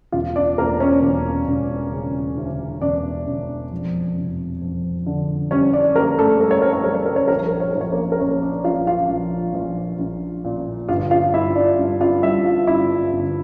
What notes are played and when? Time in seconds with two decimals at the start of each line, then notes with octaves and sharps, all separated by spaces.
0.12 E1 F4 F5
0.36 D4 D5
0.58 E1 A#3 A#4
0.80 C#4 C#5
1.02 E1
1.47 E1
1.92 C#3
2.37 D2
2.81 E1 D4 D5
3.27 E1
3.72 F2
4.17 F1
4.61 F2
5.06 D3
5.51 G3 C#4 C#5
5.73 D4 D5
5.95 G3 A#3 A#4
6.18 A3 A4
6.40 G3 A#4
6.51 C#5
6.62 A#4
6.73 C#5
6.84 G3 A#4
6.95 C#5
7.06 A#4
7.16 C#5
7.28 A#1 A#4
7.38 C#5
7.49 A#4
7.60 C#5
7.71 A#1 A#4
7.81 C#5
7.92 A#3 A#4
8.12 A#4
8.20 A#1 C#4 C#5
8.42 D4 D5
8.64 A#1 F4 F5
8.87 F4 F5
9.10 A#1
9.54 A#1
9.99 A#1
10.44 A#2
10.88 G1 F4 F5
11.11 F4 F5
11.33 G2 E4 E5
11.56 D4 D5
11.79 G2
12.01 F4 F5
12.23 G2 E4 E5
12.45 F4 F5
12.67 G1 E4 E5
13.13 G1